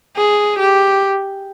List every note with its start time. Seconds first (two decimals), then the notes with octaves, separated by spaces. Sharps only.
0.17 G#4
0.59 G4